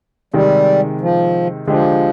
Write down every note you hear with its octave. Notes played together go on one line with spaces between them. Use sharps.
C3 D#3 G3 G#3
F3
D3 F3 G#3 D4 G4